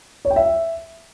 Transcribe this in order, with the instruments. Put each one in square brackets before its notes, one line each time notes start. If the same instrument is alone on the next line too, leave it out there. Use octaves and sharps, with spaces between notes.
[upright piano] C#5
G5
E5